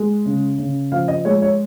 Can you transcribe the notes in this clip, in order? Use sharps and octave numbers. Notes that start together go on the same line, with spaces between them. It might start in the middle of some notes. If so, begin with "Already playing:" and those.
Already playing: G#3
C#3
C#3
F3 F5
D#5
G#3 C#5
C#5